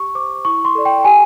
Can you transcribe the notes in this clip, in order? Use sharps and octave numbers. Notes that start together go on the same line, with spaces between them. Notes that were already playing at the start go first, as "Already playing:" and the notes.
Already playing: G4 C#6
C5 D6
E4 C#6
C6
A4 D5
G5
G4 G#5